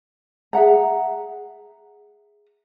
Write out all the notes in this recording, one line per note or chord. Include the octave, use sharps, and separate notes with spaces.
G#4 E5 F#5 A#5